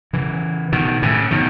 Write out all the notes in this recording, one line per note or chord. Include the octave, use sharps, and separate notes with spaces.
C#3 E3
B2 D#3
A2 C#3
B2 D#3